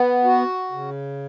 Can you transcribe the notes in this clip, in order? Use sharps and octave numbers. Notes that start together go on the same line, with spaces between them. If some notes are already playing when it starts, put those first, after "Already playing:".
Already playing: B3
F#4
C#3